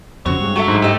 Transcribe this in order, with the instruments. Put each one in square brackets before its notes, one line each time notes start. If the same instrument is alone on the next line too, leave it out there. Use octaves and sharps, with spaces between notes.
[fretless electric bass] F2 C#3 [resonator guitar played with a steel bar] C4 F#4 [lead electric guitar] C#5
[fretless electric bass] G2 G#3
[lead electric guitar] F#3 [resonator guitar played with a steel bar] F#4 A4 E5
[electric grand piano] G#2
[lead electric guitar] A3 [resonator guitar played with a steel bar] G4 D#5